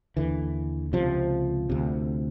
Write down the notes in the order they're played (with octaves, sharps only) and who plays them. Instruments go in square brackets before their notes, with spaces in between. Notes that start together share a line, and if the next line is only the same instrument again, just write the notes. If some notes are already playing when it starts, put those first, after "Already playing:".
[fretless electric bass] D#2 D3 E3
C#2 C3 F3
D2 C3